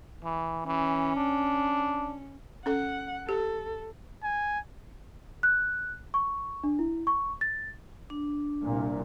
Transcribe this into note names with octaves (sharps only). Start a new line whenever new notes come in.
E3
E3 C#4
D4
C#4 A4 F#5
G4 A4
G#5
F#6
C#6
D4
E4
C#6
A6
D4
C2 A#2